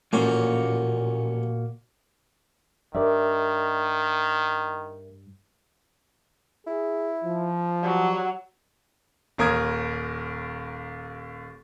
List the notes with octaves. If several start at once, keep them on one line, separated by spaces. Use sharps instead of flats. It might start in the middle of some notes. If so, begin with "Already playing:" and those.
A1 A#2 F3 A#3 C#4 F#4
G2 D#3 A#4 D5 E5
E4 G#4
F3
F#3 G3
D#1 D#2 A#4 D#6 G#6